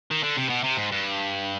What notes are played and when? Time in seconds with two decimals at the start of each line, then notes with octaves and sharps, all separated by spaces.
0.11 D#3
0.23 D3
0.37 C3
0.49 B2
0.63 C3
0.77 G#2
0.92 G2